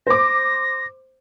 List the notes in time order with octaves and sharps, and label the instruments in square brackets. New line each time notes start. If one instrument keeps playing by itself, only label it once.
[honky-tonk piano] C5 D6 [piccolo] A#6